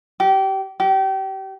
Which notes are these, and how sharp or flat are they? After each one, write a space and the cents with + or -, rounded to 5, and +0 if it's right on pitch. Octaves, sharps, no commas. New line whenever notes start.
G4 -25
G4 -30